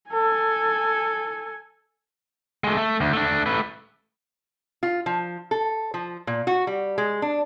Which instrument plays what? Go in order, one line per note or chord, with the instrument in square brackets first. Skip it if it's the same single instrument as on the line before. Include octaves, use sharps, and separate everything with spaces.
[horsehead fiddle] A4 G#5
[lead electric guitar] G#3 A3
A3
D2
A3 D4
A3 B4
[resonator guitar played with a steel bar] F4
F3
A4
F3
A#2
F#4
G3
G#3
D4